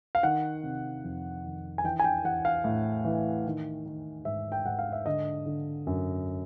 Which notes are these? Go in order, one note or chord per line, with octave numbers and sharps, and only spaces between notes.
F5
D#3 F#5
C3
F2
D#3
G#5
E3 G5
G#5
G5
E3 F#5
F5
A2
E3
D#3
D#3
G#2 E5
G5
G#2 F#5
F5
E5
D3 D#5
D3
F#2